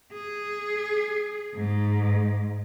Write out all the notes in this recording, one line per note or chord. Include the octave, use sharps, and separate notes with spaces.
G#4
G#2